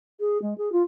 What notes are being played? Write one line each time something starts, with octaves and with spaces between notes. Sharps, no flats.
G#4
G#3
G#4
F4